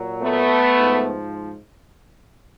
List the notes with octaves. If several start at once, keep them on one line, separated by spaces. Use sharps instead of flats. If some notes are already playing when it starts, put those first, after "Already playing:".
Already playing: A#2 F#3
A3 B3
G#2 F3